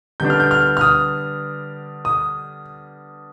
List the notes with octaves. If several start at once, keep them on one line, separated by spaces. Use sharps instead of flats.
D3 G3 B3 D4 G6
F6
G6
F6
F6
D#6
D#6